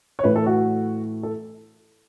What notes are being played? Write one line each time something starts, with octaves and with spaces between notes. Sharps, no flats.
C#5
A2 E3 A3 B4
A4
F#4
A4